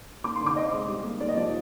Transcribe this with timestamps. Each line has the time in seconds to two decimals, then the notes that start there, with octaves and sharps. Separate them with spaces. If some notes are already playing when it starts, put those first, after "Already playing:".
0.24 A#3 D6
0.36 C6
0.41 D3
0.46 D6
0.56 C4 D#5
0.73 G#3
0.89 G3
1.04 A#3
1.20 A#3 D5
1.29 D#5
1.37 F3 D5